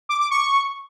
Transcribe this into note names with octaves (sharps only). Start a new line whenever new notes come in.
D6
D6
C#6